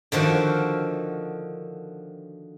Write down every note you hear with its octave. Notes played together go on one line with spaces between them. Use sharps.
D3 D#3 F3 F#4